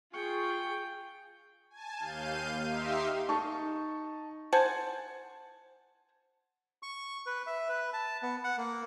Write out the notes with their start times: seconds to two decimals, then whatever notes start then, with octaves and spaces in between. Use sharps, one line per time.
0.14 F4 G#4 G5 C#6
1.70 G#5 A5
1.99 D#2 F5 G6 D#7
2.67 D#4 G4 E5 F5 C6
3.29 D#4 A5 C#6
4.53 C5 F#5 G#5 A5
6.83 C#6
7.26 B4
7.47 E5
7.69 B4
7.93 A5
8.22 B3
8.44 F#5
8.58 A#3